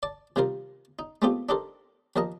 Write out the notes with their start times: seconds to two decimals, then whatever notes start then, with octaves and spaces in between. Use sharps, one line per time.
0.03 D5 A5
0.36 C3 D#3 G3 F4 A#4 C5
0.99 D#4
1.22 G#3 A3 B3 C4 F4 G4
1.49 D4 D#4 G4 A4 A#4 C5
2.16 D#2 F3 A#4 D#5 A#5